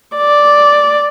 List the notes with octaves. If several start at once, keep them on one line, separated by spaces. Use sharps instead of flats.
D5